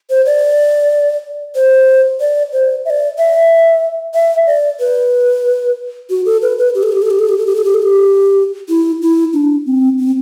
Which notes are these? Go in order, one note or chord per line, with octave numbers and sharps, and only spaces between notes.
C5
D5
C5
D5
C5
E5
D5
E5
E5
D5
B4
F#4
A4
B4
B4
G4
A4
G4
A4
G4
A4
G4
A4
G4
A4
G4
A4
G4
E4
E4
D4
C4
C4